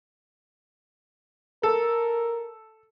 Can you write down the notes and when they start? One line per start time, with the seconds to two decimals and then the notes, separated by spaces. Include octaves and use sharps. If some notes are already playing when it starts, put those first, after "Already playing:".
1.63 A4 A#4